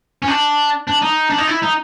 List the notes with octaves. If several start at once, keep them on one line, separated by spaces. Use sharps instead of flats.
C#4
D4
D4
D#4
D4
D#4
E4
D#4